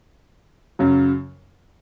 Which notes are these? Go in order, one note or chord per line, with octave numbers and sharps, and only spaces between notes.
F#2 C#3 F#3